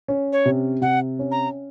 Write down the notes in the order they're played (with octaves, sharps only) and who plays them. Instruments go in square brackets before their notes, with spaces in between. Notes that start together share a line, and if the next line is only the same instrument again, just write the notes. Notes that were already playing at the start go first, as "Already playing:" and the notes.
[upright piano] C#4
[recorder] C#5
[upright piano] C3
[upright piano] C3 [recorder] F#5
[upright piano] C#4
[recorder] A#5